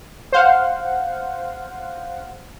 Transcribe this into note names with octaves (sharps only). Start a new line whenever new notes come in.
C5 F5 F#5